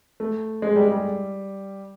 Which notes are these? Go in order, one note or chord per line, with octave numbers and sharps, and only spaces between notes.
A3
G#3
G3
G#3
G3